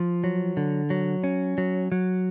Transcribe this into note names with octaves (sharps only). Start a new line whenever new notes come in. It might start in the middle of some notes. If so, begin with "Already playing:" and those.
Already playing: F3
F#3
D3
F#3
C#4
F#3
F#3